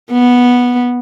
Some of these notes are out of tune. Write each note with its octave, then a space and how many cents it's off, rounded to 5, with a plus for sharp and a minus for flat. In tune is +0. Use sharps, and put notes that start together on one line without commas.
B3 -10